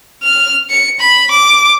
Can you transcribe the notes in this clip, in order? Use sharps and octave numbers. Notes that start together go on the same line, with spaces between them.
F6
C#7
B5
D6